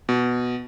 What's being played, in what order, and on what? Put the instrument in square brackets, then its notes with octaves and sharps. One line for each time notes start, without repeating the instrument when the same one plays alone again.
[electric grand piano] B2